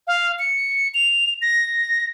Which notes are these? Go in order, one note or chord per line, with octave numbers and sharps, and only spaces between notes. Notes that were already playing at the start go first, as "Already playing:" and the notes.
F5
C#7
F7
A#6